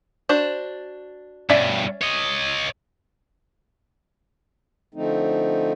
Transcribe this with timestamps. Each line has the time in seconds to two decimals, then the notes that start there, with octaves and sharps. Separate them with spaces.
0.29 D4 F#4 C5
1.50 G2 B2 C#4 D5 E5
2.01 C#5 D#5
4.94 D3 F3 A3 C4 D#4